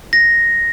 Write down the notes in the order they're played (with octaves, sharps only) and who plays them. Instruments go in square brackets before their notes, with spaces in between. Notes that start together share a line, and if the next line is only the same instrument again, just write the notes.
[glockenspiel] A#6